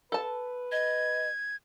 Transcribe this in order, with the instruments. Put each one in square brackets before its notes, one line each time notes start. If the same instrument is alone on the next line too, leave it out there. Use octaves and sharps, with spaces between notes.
[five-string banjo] A4 A5 [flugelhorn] B4
[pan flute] D#5 [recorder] G#6